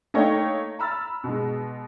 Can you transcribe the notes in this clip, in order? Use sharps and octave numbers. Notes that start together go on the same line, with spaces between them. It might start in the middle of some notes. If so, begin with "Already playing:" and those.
A3 A#3 D#4 C#5 G5 A#6
A#5 B5 E6 F6 A6
B2 G#3